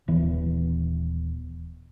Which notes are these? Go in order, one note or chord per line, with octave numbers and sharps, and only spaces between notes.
D#1 E3 B3